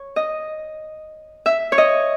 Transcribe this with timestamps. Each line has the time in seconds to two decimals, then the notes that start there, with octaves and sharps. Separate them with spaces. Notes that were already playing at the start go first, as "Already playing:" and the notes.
Already playing: C#5
0.16 D#5
1.46 E5
1.72 C#5
1.78 D#5